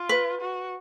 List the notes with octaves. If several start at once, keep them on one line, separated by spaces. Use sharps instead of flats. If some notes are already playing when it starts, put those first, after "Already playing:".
Already playing: F4
B4
F#4